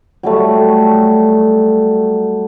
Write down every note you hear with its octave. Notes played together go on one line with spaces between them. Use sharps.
F#3 G3 A3